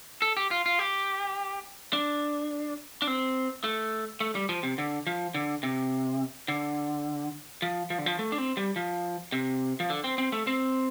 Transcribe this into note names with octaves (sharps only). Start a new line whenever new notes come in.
A4
G4
F4
F4
G4
D4
D4
C4
A3
A3
G3
F3
C3
D3
F3
D3
C3
D3
F3
F3
D3
F3
A3
D4
C4
G3
F3
C3
F3
D3
C4
C4
A3
C4